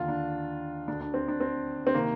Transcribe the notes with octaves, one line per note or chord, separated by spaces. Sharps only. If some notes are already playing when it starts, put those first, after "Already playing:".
Already playing: D#2 D3 F4
D4
D2 D3 D4
D4
C4
D4
C4
C4
C3 D#3 A#3